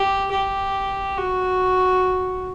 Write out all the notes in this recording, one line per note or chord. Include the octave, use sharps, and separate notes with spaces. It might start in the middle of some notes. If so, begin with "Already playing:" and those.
Already playing: G4
G4
F#4